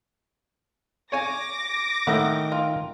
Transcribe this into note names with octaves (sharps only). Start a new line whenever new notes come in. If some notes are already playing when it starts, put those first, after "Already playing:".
C#5 G#5 D6 A#6
A2 D#3 F#5
F4